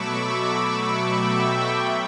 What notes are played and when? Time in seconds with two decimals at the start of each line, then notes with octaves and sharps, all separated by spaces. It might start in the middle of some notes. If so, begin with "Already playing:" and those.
Already playing: B2 F#3 A3 B5 C#6 D6 E6
0.97 E5 G5
1.32 E5 G5
1.69 B2 F#3 A3